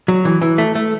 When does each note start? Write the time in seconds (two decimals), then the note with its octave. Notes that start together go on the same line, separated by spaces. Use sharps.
0.08 F#3
0.25 E3
0.42 E3
0.58 A3
0.75 A3